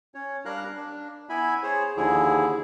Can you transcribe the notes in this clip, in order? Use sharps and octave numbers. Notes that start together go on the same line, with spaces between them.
C#4 C#5
G3 D4 A#4 F5 A#5 F#6
D4
B3 E4 E5 G#5 B5
G#4 C5 C#5
D#2 D3 F3 E4 G#4